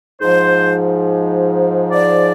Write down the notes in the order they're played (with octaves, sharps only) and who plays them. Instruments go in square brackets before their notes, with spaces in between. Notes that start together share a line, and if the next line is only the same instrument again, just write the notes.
[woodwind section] G#2 F3 C5
D5